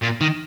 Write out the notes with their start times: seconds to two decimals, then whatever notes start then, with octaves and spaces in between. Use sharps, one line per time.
0.02 A#2
0.21 D#3